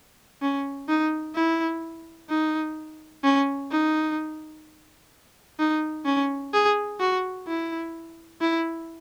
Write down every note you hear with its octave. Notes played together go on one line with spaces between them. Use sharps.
C#4
D#4
E4
D#4
C#4
D#4
D#4
C#4
G#4
F#4
E4
E4